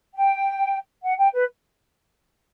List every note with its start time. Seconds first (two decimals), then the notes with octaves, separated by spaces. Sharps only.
0.15 G5
1.03 F#5
1.18 G5
1.33 B4